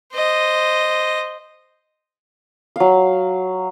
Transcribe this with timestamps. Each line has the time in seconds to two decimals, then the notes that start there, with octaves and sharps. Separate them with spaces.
0.14 C5 D#5
2.76 F#3 F5